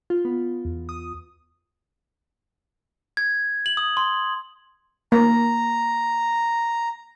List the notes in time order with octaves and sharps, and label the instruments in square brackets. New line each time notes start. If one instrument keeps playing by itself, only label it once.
[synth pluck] F4
B3
E2
D#6
[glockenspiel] G#6
F#7
D#6
C6
[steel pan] A#3 [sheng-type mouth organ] A#5